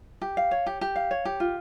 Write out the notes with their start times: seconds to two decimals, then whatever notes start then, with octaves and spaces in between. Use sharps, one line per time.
0.21 G4
0.37 F5
0.51 C#5
0.66 G4
0.81 G4
0.96 F5
1.11 C#5
1.25 G4
1.40 F4